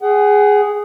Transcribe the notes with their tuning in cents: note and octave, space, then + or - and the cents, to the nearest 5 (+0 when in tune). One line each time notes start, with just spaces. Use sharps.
G#4 +0 F#5 +30